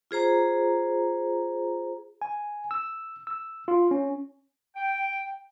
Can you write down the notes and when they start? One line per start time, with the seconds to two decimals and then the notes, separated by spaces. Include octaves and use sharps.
0.11 F4 G#4 C5 A#5
2.22 G#5
2.71 E6
3.27 E6
3.68 F4
3.91 C#4
4.76 G5